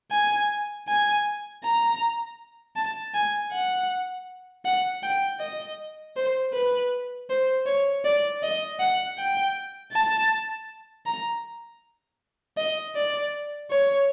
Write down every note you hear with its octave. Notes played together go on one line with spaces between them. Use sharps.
G#5
G#5
A#5
A5
G#5
F#5
F#5
G5
D#5
C5
B4
C5
C#5
D5
D#5
F#5
G5
A5
A#5
D#5
D5
C#5